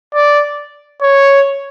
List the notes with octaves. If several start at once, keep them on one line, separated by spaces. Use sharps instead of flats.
D5
C#5